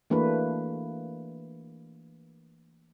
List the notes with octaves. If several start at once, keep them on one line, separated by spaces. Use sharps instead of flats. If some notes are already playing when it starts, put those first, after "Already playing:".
E3 A3 A#3 D4 F#4 B4